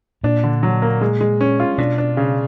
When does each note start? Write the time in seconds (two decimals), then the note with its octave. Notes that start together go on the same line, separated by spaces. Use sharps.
0.24 A#2 D4
0.44 D3
0.63 F#3
0.82 A#3
1.01 G#3
1.21 G#3
1.41 C#4
1.60 F4
1.78 B2 D4
1.98 D4
2.17 C#3